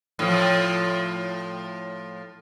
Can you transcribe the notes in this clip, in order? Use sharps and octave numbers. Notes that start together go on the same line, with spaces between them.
A2 F3